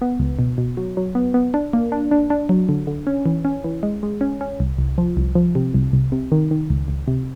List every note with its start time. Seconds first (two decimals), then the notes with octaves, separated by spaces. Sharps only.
0.02 B3
0.20 C#2
0.39 B2
0.58 B2
0.77 F#3
0.97 F#3
1.15 B3
1.34 B3
1.54 D4
1.73 A#3
1.92 D4
2.11 D4
2.30 D4
2.49 F#3
2.69 D3
2.87 D3
3.07 C#4
3.26 E3
3.45 C#4
3.64 E3
3.83 G#3
4.03 G#3
4.21 C#4
4.41 C#4
4.60 C2
4.78 C2
4.98 F3
5.17 C2
5.35 F3
5.55 C3
5.74 C2
5.93 C2
6.12 C3
6.32 D#3
6.51 D#3
6.70 C#2
6.88 C#2
7.08 C3